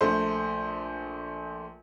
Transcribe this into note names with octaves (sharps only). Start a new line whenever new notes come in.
A#1 A3 C5